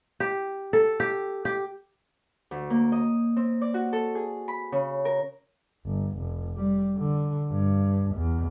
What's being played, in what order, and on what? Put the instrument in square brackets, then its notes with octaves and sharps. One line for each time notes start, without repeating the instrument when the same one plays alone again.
[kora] G4
A4
G4
G4
[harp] D2
A#3
D#5
C4
D5
F#4
A4
G#4
B5
C#3
A#4
[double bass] G1
F1
G3
D3
G2
E2